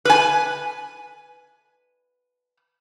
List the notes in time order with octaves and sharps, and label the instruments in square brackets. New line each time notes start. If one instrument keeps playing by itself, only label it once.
[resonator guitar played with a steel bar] B4 G#5